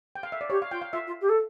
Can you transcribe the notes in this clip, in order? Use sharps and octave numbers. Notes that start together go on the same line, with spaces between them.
G5
F5
E5
D5
G4 C#5
F5
F4 G5
F5
F4 E5
F4
G4
A4